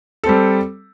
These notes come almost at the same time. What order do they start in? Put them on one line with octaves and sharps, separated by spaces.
A4 C4 G3